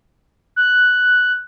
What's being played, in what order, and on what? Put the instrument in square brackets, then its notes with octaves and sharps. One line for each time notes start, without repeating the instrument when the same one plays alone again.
[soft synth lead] F#6